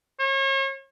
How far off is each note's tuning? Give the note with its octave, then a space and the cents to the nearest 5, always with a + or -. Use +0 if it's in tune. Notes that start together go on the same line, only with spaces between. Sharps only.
C#5 -40